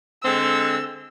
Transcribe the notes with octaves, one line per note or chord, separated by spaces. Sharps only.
D3 G#3 C4 E6